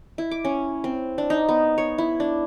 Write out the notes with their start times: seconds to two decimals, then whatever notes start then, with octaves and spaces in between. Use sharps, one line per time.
0.18 E4
0.31 D6
0.45 C#4
0.84 C4
1.18 D4
1.30 D#4
1.49 B3
1.78 C#5
1.98 E4
2.20 D4